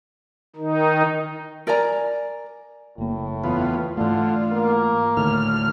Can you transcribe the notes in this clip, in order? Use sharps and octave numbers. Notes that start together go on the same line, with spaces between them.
D#3 D#4
A#4 D5 G#5 A#5
F#1 A2 A#3
E2 B3 F4
G#2 D3 E3 A3 F4
A#3
D2 A2 D3 D#3 F6